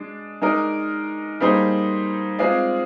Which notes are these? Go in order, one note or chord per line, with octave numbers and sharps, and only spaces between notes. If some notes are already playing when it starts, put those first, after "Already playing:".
Already playing: G#3 D4
G#3 D#4 A#4 D5
G3 A#3 D#4 G#4 C5
G#3 C4 F4 G#4 D5